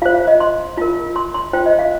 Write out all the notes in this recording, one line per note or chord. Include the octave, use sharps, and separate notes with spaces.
F4 C5 F5
F5
D#5
C6
F4 A#4
C6
C6
F4 C5 G5
D#5
F5